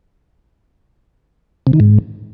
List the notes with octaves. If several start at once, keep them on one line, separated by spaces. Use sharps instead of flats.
C3
D#3
G#2